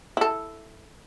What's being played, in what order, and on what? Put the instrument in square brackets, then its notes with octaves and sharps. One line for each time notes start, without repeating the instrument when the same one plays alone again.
[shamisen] E4 A4